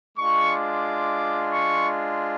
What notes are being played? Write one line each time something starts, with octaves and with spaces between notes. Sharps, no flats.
G#3 D4 F4 C#6
D6
C#6